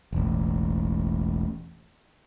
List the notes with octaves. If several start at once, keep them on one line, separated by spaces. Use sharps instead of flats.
E1 A1